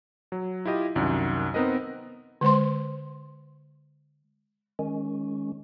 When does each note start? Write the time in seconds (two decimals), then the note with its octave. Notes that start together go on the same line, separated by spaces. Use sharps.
0.32 F#3
0.65 E4 F4 G4 D#5
0.96 C2 F#2 D#3
1.54 B3 C4 D#4 A#4 B4 D#5
2.41 D3 G#3 C5 C6
4.79 D#3 G#3 C#4